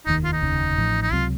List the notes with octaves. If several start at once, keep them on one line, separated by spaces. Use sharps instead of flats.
F1 D#2 D#3 D#4
F4
D#4
F1 D#2 C#3
A1 A2 F3
D#4
C#2 C3 F#3 C4 F4